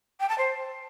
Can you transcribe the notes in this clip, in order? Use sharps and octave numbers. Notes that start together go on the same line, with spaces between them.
G5
A5
C5